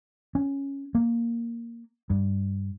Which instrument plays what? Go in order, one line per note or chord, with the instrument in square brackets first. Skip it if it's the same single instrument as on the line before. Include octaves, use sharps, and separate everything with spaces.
[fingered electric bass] C#4
A#3
G2